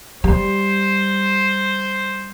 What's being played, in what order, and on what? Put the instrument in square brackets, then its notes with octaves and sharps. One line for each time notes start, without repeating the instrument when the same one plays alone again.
[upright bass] G3 [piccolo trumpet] C5